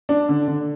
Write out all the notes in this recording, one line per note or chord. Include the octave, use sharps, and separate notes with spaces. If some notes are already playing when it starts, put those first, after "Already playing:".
D4
D3
D3